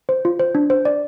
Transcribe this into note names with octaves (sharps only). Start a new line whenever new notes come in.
C5
F4
C5
D4
C5
D5